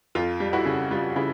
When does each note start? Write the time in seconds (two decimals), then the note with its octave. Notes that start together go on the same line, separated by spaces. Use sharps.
0.15 F2 F4
0.40 G3
0.53 E4 F#4
0.65 C#3
0.91 G3 F4
1.16 C#3 E4